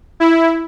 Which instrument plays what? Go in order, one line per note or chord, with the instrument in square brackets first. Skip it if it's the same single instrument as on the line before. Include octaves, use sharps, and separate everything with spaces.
[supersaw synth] E4